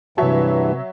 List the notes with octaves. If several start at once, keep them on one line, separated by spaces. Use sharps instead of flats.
G2 C3 E3 F#3 C#5 E5 A5